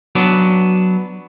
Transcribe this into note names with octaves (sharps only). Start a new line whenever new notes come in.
F#3 B3 D4